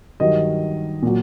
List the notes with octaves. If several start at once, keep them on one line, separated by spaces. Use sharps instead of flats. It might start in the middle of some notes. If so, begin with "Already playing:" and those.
G2 D#3 F#3 D#5
A#2 F#3